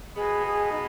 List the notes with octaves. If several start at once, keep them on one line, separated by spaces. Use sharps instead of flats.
B2 G#3 B3 G#4
G#4
D#4